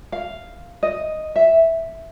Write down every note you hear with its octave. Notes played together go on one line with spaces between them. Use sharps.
F5
D#5
E5